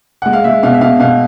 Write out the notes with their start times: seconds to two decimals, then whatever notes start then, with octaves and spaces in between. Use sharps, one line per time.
0.22 G#3 F#5
0.33 F5
0.44 G#3 E5
0.63 B2 F5
0.74 E5
0.81 B2 F5
1.00 B2 F5